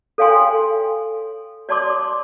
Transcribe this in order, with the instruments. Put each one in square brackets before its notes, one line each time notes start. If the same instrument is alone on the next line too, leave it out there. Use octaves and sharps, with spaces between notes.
[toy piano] A4 C#5 F5 G5 G#5 C6
C#5 D5 A5 C6 D6 D#6